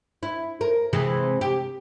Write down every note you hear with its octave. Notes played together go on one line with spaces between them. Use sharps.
E4
A#4
C3 E3 G#3
G4